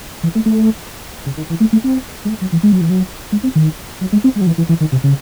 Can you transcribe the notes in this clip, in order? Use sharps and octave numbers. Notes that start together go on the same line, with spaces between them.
E3
A3
A3
C#3
D#3
E3
A3
A3
C4
G#3
A3
F#3
E3
G#3
F#3
E3
F#3
G#3
C4
D#3
F#3
G#3
C4
G#3
F#3
E3
E3
E3
D#3
C3
C#3